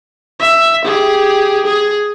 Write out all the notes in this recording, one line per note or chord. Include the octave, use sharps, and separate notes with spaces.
E5
G4 G#4
G#4